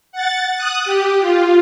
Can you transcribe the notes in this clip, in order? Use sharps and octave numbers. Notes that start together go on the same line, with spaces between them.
F#5 A6
D#6 F#6
G4
F4